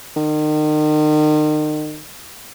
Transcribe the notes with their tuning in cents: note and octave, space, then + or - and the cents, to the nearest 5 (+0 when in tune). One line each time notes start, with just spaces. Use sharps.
D#3 -35